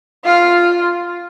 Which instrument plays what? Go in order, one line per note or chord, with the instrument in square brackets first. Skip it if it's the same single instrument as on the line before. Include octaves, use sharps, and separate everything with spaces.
[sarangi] F4 [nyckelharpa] F5